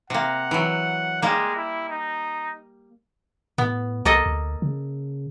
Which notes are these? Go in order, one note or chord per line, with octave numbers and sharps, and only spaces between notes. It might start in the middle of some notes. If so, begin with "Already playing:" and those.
C3 A#3 F#5
E3 F#3
G3 G#3 A#3
E4
D#4
A2 B3
C2 A#3 A4 D#5
D2
C#3